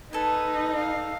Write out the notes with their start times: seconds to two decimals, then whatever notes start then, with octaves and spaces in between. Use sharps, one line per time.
0.13 D#4 A4 B4 G#5
0.75 F5